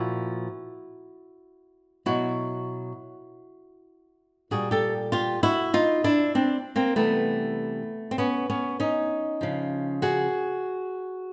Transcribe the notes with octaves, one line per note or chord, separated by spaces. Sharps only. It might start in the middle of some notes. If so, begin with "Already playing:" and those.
Already playing: A#2 F3 E4 F#4
B2 F#3 E4 F#4
A#2 G3 F#4 G#4
G4 A4
F4 G4
E4 F#4
D#4 F4
D4 E4
C4 D4
A#3 C4
C3 E3 G3 A3 B3
C4
B3 C#4
B3 C#4
C#4 D#4
C#3 F3
F#4 G#4